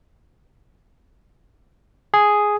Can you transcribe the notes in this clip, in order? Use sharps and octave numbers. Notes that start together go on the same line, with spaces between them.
G#4